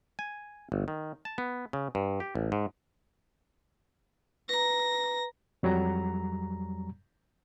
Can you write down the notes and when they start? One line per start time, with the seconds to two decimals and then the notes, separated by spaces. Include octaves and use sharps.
0.19 G#5
0.72 G1
0.88 D#3
1.25 A5
1.38 B3
1.73 C#3
1.95 G2
2.20 G4
2.35 A1
2.52 G#2
4.49 B4 A#5 A#6
5.63 F2 F#3 G3 A#5